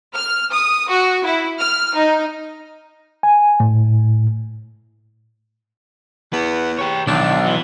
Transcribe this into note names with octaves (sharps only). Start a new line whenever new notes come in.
F6
D#6
F#4
E4
F6
D#4
G#5
A2
E2 B3
G4 C#5
B1 D#3 E3 D4
E3